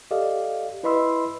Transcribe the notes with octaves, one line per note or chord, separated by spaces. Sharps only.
G4 A4 D5 D#5 F5
E4 B4 D#5 B5 C6 E6